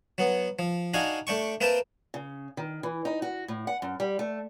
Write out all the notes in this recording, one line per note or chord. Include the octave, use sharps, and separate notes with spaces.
F#3 B3
F3
D4 D#4 F#4 F5 G#5
A3 D4 G5 C#6
A#3 C4 B4 E5 G5 A5
C#3
D#3
E3
D#4
F#4
A2
F#5
F#2
G3
A3